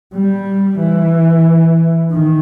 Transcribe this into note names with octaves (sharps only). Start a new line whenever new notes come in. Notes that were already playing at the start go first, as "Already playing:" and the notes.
G3
E3
D#3